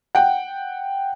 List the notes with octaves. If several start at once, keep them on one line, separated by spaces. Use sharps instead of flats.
F#5 G5